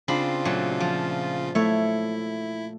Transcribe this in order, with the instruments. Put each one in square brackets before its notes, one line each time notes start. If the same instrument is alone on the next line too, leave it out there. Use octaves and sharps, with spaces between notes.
[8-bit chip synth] C#3 F4 [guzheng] C4 D4 B5
[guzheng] A#2 F#3 A3
F3
[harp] A3 [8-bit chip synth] E4 [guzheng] C#5